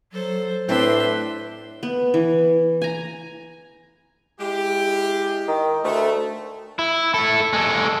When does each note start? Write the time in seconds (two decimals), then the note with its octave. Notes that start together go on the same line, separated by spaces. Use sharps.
0.12 F#3 A4 C5
0.69 A2 C4 D4 B4 E5 C6
1.83 B3
2.14 E3
2.82 G#5 A#5
4.40 G#3 E4 G4
5.48 D#3
5.84 D2 A3
6.79 E4
7.14 E4 A4
7.53 G#3 A4